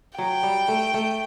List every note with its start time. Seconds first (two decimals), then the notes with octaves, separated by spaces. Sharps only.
0.18 F#3 G5
0.43 G3
0.68 A3
0.94 A3